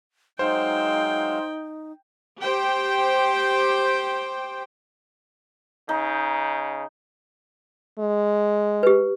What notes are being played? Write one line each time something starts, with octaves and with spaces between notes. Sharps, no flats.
F#3 G#3 D#4 C5 F5 G5
G4 C5 G5
C#3 D#4
G#3
G4 B4